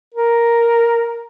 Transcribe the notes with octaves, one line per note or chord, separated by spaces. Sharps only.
A#4